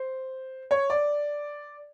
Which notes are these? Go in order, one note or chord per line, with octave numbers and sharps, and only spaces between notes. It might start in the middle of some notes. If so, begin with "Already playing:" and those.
Already playing: C5
C#5
D5